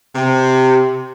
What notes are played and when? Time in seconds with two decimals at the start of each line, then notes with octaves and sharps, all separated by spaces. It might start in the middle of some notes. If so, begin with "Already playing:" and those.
0.15 C3